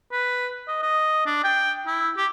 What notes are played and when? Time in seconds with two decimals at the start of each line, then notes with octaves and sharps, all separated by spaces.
0.12 B4
0.68 D#5
0.82 D#5
1.26 D4
1.44 G5
1.87 E4
2.17 G4